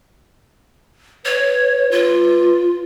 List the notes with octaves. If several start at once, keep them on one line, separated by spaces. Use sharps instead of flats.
B4 C#5
F4